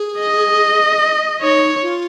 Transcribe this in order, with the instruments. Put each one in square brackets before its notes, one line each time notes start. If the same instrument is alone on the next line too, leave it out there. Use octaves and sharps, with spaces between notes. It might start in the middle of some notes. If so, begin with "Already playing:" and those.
Already playing: [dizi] G#4
[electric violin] D#5
[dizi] D#4 [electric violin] C#5
[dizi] F4